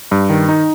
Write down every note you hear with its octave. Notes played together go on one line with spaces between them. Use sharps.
G2
D#3
D#4